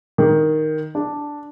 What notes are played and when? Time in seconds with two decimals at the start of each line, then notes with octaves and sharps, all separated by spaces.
0.18 D#3
0.95 D4